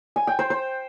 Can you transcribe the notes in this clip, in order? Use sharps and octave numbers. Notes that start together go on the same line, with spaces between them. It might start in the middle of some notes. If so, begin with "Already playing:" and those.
G#5
G5
C5
C5